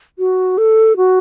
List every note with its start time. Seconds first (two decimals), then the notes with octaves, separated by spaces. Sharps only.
0.19 F#4
0.58 A4
0.97 F#4